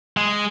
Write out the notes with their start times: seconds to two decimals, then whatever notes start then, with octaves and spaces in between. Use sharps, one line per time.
0.17 G#3